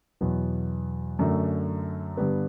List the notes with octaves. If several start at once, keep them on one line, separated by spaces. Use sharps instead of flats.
E2 B2 F#3 B3
F#2 D3 F#3 A3
G2 D3 G3 B3